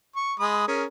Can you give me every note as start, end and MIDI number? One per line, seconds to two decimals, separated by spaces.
0.16 0.33 85
0.39 0.66 56
0.39 0.66 83
0.39 0.66 87
0.68 0.84 61
0.68 0.84 68
0.68 0.84 70